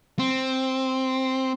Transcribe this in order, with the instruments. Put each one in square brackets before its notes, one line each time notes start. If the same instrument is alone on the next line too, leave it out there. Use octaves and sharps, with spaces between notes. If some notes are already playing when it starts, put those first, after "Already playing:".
[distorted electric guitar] C4